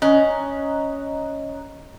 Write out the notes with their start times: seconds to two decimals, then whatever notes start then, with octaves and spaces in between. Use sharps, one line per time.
0.02 C#4 D#5 A#5 F#6